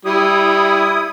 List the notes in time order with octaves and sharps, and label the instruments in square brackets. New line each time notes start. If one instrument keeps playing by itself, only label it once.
[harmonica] G3 [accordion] E4 D#6